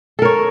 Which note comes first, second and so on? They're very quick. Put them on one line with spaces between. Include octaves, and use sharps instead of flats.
A4 A#4 C#5